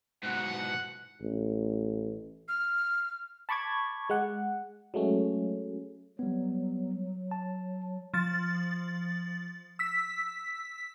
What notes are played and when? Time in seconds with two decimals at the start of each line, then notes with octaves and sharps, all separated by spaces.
0.23 G#2 B2 F#5
1.22 A1
2.48 F6
3.49 A5 B5 C#6 D6 G#6
4.10 G#3 F#5
4.94 F#3 G#3 A3 C#4
6.19 F#3 G3 B3
7.31 A5
8.14 F3 A6
9.79 E6 B6